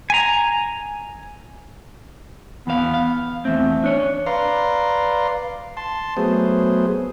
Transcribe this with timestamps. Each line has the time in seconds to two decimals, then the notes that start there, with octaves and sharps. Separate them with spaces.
0.10 G#5 A#5
2.67 E2 B3 F5
2.94 F5
3.45 E2 A3 C4
3.84 D4 C#5
4.26 B4 D5 F5 A#5 C6
5.77 A5 C6
6.17 F#3 A3 B3 G#4 C5